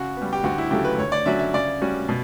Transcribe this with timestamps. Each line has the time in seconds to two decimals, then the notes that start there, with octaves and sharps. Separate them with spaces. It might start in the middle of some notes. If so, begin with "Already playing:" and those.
Already playing: C#3 F#4
0.17 G3 B3
0.33 G4
0.44 D2 F#4
0.58 E4
0.71 C#3 F#3 A3 G4
0.85 B4
0.98 D2 C#5
1.12 D5
1.26 D3 F#3 C#4 F#4 E5
1.39 E5
1.54 C#3 D5
1.81 G3 C#4 F#4
2.09 B2